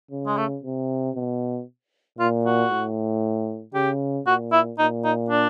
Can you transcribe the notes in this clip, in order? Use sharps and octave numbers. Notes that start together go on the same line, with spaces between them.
C#3
G#3
A3
C3
B2
A#2 F4
F#4
A2
C#3 G4
A#2 F#4
E4
A#2 D#4
D#4
D4